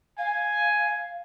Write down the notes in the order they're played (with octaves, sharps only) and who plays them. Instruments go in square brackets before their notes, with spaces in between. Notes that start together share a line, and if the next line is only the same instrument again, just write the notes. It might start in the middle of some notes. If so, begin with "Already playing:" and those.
[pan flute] F5 [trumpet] G#5